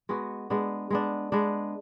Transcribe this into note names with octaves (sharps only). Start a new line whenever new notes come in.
G#3 B3 F#4
G#3 B3 D4
G#3 B3 D4
G#3 B3 D4